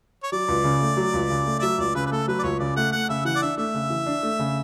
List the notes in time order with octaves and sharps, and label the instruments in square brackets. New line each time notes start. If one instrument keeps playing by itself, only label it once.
[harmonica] C#5
[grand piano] F#3 [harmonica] D5
[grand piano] C#2
C#3
A3
F#3
C#2
C#3
A3
[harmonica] D5
[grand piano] F#3 [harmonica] E5
[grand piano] C#2 [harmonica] D5
[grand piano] C#3 [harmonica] B4
[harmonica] B4
[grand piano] A3 [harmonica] A4
[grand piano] F#3 [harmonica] B4
[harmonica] D5
[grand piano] C#2 [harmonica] C#5
[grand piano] C#3 [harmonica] D5
[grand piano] A3 [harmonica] F#5
[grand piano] A3 [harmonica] F#5
[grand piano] C#3 [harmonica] E5
[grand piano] E3 [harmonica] F#5
[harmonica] D5
[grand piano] D4 [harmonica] E5
[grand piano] A3 [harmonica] E5
[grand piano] C#3
E3
D4
A3
C#3